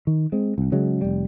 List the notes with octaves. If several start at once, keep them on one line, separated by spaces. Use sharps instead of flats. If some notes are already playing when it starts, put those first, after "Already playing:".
D#3
G#3 C4
C2
C#3 F#3 G#3
F1 G3